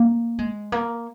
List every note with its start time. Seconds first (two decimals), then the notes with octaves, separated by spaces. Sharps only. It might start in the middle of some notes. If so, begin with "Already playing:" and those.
Already playing: A#3
0.39 G#3
0.72 A#3